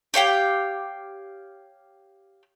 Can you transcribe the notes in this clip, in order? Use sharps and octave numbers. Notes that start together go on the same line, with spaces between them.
G4 C#5 F5 G5